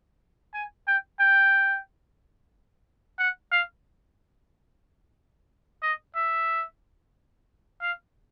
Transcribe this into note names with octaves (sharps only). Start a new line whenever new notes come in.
G#5
G5
G5
F#5
F5
D#5
E5
F5